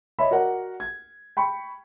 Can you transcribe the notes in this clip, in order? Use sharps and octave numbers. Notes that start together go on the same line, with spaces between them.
C#5 D#5 E5 B5
F#4 A#4 D5 F#5
G#6
G5 B5 C#6